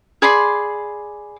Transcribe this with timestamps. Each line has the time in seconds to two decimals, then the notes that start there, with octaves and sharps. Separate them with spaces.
0.22 G#4 D5 B5 C6